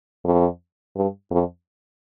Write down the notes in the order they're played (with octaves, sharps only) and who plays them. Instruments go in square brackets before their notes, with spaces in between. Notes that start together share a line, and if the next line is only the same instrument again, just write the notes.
[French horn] F2
G2
F2